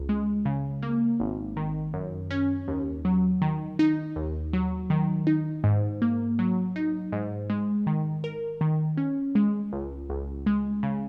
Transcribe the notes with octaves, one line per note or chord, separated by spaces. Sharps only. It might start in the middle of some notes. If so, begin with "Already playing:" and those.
Already playing: C#2
G#3
C#3
A#3
G#1
D#3
F#2
C#4
D#2
F#3
D#3
D#4
D#2
F#3
D#3
D#4
G#2
A#3
F#3
D#4
G#2
G#3
D#3
A#4
D#3
C#4
G#3
C#2
C#2
G#3
C#3